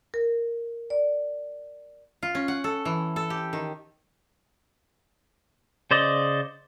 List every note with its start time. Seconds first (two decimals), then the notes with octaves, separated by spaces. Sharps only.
0.14 A#4
0.90 D5
2.23 F4
2.35 C#4
2.48 F#5
2.64 A4
2.85 E3
3.16 A4
3.30 G4
3.53 D#3
5.91 C#3 C5 D5 D#5